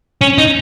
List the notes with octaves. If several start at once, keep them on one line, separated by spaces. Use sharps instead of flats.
C#4
D#4